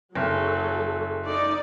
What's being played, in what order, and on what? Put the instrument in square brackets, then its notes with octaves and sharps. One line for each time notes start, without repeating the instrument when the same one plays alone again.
[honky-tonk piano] F#1 [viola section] F#3 G#4 A4
[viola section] D#4 D5